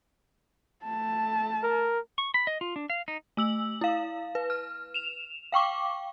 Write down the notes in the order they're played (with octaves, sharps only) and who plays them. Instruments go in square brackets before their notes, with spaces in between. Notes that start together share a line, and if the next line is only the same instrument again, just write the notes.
[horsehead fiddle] A3 A5
[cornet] A#4
[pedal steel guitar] C#6
B5
D#5
F4
D4
F5
D#4
[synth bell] A3 E6 F#7
E4 F5
B4
F6
E7 F7
F5 G5 C#6 D6